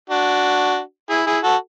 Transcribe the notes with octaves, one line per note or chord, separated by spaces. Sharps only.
D4 F#4
E4 G#4
E4 G#4
F#4 A4